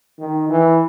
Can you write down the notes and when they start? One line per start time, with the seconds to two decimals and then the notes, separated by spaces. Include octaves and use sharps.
0.19 D#3
0.50 E3